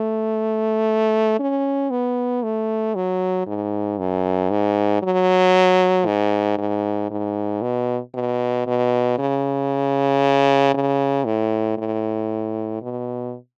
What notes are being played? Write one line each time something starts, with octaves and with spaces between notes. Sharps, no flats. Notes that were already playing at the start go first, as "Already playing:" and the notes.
Already playing: A3
C#4
B3
A3
F#3
G#2
F#2
G#2
F#3
G#2
G#2
G#2
B2
B2
B2
C#3
C#3
A2
A2
B2